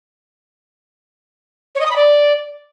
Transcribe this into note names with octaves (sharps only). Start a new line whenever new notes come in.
C#5
D#5
D#6
B5
D5